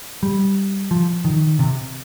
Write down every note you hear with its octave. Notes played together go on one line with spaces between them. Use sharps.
G3
F3
D#3
C3